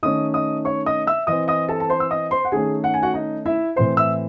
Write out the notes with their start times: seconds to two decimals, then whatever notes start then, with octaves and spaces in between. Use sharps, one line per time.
0.03 D#3 A3 C#4 D#5 D#6
0.34 D#5 D#6
0.65 C#5 C#6
0.86 D#5 D#6
1.07 E5 E6
1.27 E3 C4 D#5 D#6
1.48 D#5 D#6
1.69 A4 A5
1.80 A5
1.90 C5 C6
2.00 E6
2.11 D#5 D#6
2.31 C5 C6
2.45 F#5
2.52 D#3 A3 C#4 G#4 G#5
2.84 F#5
2.94 G#5
3.03 F#4 F#5
3.14 D#4 D#5
3.46 E4 E5
3.76 A2 E3 C4 C5 C6
3.97 E5 E6